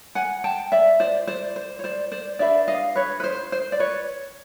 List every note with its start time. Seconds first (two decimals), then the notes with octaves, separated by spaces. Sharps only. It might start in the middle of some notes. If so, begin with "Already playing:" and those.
0.15 F#5 G#5
0.44 G5 A5
0.72 D5 E5
1.00 C5 D5
1.27 C5 D5
1.56 C5
1.79 C#5
1.84 C5 D5
2.12 C5 D5
2.39 D4 G4 B4 D5 E5
2.68 D#5 F5
2.96 B4 C#5
3.20 B4
3.24 C5
3.52 C5
3.72 D5
3.79 B4 C#5